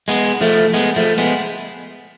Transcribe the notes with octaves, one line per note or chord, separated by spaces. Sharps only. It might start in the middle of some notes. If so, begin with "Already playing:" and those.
G#3 B3
F3 A3
G#3 B3
F3 A3
G#3 B3